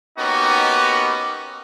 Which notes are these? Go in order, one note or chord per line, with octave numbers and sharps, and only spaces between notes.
A#3 B3 C#4 D#4 F#4 G4